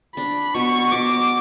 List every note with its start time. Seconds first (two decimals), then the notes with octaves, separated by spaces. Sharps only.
0.17 D4 B5
0.54 B2 C#6
0.92 B2 D6